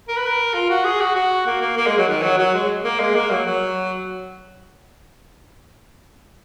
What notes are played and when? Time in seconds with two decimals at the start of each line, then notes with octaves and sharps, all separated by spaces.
0.08 A#4
0.17 B4
0.26 A#4
0.54 F4
0.70 F#4
0.85 G#4
1.01 F#4
1.15 F#4
1.47 A#3
1.61 A#3
1.77 A#3
1.87 G#3
1.98 F#3
2.08 D#3
2.22 F#3
2.38 F#3
2.54 G#3
2.84 A#3
3.00 G#3
3.15 A#3
3.30 F#3
3.46 F#3